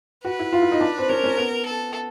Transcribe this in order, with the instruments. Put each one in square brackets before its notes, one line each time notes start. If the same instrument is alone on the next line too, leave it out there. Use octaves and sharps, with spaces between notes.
[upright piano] F#4 [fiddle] B4
[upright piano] E4
F4
E4
D#4
D4
C4
[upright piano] C#4 [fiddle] A#4
[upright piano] C#4
B3
[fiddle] A4